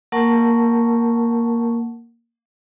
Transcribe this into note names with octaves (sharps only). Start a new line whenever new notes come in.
A#3 A#4 F#5 A5 C#6